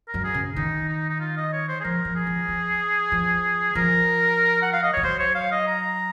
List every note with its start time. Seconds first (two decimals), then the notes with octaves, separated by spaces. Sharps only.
0.08 A#4
0.14 F#2
0.24 G#4
0.34 C#3
0.56 D#3 D#4
0.89 D#4
1.09 D#4
1.20 F4
1.37 D#5
1.53 C#5
1.68 C5
1.80 G#4
1.84 F3 A#4
2.05 F3
2.15 G#4
2.27 F3
2.48 F3
3.12 F3
3.75 F3 A#4
4.62 F#5
4.73 F5
4.83 D#5
4.93 F3 C#5
5.03 F#3 C5
5.19 C#5
5.35 F5
5.52 D#5
5.67 A#5